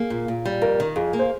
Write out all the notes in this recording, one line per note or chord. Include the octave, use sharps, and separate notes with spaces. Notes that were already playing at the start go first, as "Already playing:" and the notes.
Already playing: A#3 G#4
A#2
A#2
G3
F2 A#4
D#3
F2 G#4
A#3
C5